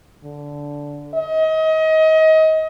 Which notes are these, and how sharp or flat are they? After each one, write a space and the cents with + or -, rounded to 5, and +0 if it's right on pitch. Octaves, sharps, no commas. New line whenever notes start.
D3 -10
D#5 +30